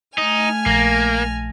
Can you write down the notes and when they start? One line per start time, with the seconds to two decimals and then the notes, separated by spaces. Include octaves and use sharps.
0.18 A3 D#4 G#5 F6
0.66 A#1 A#3 A#6